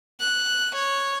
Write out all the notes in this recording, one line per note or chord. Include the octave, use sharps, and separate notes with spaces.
F#6
C#5